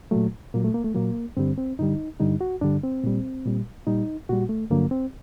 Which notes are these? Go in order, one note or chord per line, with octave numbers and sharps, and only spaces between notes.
A#2 F#3 A3
A#2 F#3 A#3
A3
A#3
A3
A#2 F#3 A#3
G2 D3 G3 C4
C4
G2 D3 G3 D#4
G2 D3 G3 D#4
F#4
G2 D3 G3 D4
C4
A#2 G3
A#2 G3
A#2 G3 D#4
A#2 G3 F#4
A3
G2 D3 F#3 A#3
C4